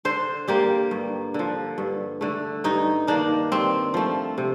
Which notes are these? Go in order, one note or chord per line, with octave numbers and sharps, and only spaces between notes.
D3 C5
G3 A#3 G4
G2
D3 F3
G2
D3 A3
G2 D#4
D#3 A#3 D4
G2 C4
F3 A3
C3